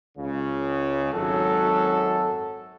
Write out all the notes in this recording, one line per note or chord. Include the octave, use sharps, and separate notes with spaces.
C#2 C#3
G#1 F#2 F#3 A4